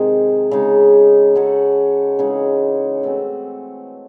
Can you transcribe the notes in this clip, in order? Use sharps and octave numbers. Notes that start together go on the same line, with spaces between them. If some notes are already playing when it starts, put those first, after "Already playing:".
Already playing: C3 D#3 G#3
C#3 G#3 D#4
G#3 C#4 F#4 A4
C#3 E3 G#3 D#4
E3 A3 C4 F#4